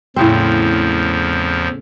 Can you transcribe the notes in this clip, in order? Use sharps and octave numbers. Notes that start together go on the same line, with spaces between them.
E2 A2 C#3 F3 C4